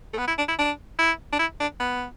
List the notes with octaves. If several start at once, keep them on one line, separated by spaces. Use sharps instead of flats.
A3
B3
E4
D4
E4
D4
E4
D4
E4
D4
B3